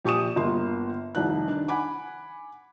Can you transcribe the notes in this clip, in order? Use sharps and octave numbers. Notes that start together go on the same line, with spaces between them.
A#1 G4 C#6 D#6 E7
G1 A#3 C6
F1 C2 D#3 F#6
D#3 D4
F#5 G#5 B5 D6